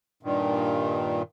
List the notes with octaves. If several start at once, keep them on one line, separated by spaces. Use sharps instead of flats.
G2 A#2 D#3